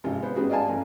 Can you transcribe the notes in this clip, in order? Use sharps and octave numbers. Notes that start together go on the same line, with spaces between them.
G#1 C3 F4
B3 C5
G#2 G3 B3 F#4 G#4
D5 D#5 F5 G#5 A5
A1